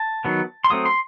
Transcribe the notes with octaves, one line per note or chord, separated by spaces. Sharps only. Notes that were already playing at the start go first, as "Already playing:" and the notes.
Already playing: A5
D#3 F#3 B3
C6
F#3 A3 C4 D#6
C6